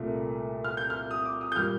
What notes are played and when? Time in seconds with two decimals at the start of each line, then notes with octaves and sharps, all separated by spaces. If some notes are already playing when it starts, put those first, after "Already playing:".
Already playing: C2 A#2 A3
0.64 F6
0.77 G6
0.90 F6
1.11 D#6
1.25 D6
1.41 D#6
1.52 G6
1.56 A#2 G3 F6